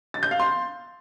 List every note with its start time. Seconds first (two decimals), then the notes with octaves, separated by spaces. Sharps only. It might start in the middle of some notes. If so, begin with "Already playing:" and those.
0.14 A6
0.23 G6
0.31 F5
0.40 C6